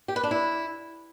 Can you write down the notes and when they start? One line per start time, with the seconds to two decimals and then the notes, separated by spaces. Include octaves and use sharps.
0.08 G4
0.16 B4
0.23 D4
0.31 E4